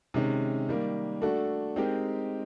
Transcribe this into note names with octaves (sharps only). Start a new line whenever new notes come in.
C3 D#3 G#3 C#4
D#3 G3 A#3
A3 D4 F#4 A4
G#3 C4 D#4 G4 A#4